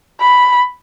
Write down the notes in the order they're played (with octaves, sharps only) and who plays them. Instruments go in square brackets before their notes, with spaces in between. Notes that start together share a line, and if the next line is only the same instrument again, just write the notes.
[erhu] B5